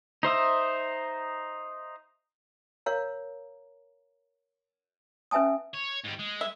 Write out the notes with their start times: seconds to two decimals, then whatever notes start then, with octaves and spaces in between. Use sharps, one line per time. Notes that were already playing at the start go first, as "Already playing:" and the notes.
0.23 D#4 C5 E5 D#6
2.86 A#4 C#5 F5 A#5
5.31 C#4 B4 E5 G#5 A5 D#6
5.74 C#5
6.04 G#2 G3
6.19 G#3
6.41 E5